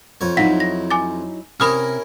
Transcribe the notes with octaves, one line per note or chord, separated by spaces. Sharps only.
F2 C#5
F#3 D#4 E4 F5 F#5 B6
A#6
G#5 D6 A6
C3 C#4 E4 A#4 B5 D#6 F6